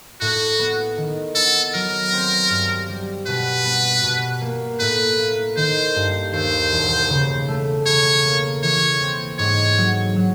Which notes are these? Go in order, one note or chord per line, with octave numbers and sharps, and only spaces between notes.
A2 F#4
B3
D#3
B3 A4
F#3 A#4
C4
G2
G3
B2 B4
B3
B2
A#3
A2 B4
A#3
D#3 C5
G2
D#2 C5
E1
C#3
A3
C#3 C#5
A#3
E3 C#5
C4
G#2 C#5
F#3
F#3